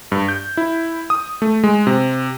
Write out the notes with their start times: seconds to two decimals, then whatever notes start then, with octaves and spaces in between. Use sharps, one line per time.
0.12 G2
0.28 G6
0.57 E4
1.10 D#6
1.42 A3
1.64 G#3
1.87 C3